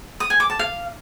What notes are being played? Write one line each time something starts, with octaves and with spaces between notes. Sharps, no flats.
D#6
G#5
D6
A5
F5